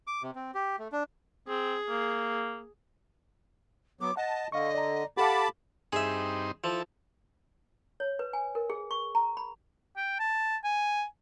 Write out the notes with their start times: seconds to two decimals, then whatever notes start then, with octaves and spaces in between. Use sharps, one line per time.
0.07 D6
0.23 C3
0.36 C4
0.54 G4
0.79 A3
0.92 D4
1.48 C4 G#4
1.89 A#3
4.01 F#3 B3 D6
4.17 D#5 F#5 A5
4.52 D3 D#5 F5 C#6
4.74 D5 A#5
5.17 G4 A4 F5 F#5 A5 B5 D6
5.93 G2 C4 D#4 G#4 E5
6.64 F3 E4 A4
8.00 C#5
8.19 B4
8.33 G#5
8.55 A#4
8.70 G#4
8.91 C#6
9.15 A#5
9.37 B5
9.97 G5
10.19 A5
10.64 G#5